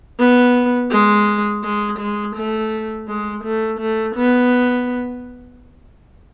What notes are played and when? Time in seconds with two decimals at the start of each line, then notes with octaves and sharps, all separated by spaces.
0.19 B3
0.91 G#3
1.64 G#3
1.99 G#3
2.35 A3
3.08 G#3
3.44 A3
3.80 A3
4.16 B3